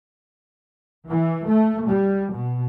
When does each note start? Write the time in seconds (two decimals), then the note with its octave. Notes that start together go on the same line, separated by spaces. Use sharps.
1.07 E3
1.46 A3
1.87 G3
2.34 B2